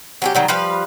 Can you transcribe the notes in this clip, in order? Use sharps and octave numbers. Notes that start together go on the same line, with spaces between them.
F#3 C#4 G4
D#3 F#3 G3
F3 G3 B4 F5